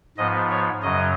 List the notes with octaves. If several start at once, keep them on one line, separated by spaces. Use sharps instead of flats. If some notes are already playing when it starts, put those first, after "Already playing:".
G#2 F3 B3 D#5
C#5
F#2 C#3 F#3 D#5